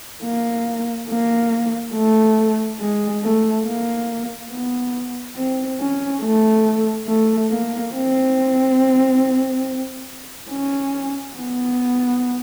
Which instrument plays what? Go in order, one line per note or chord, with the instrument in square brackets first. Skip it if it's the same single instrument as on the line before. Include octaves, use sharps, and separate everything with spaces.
[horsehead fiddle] A#3
A#3
A3
G#3
A3
A#3
B3
C4
C#4
A3
A3
A#3
C4
C#4
B3